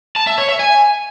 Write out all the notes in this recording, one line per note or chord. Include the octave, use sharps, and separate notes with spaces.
A5
E5
C#5
E5
G#5